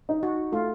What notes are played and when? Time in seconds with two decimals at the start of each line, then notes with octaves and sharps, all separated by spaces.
0.09 D#4
0.23 F#4
0.52 A3 F4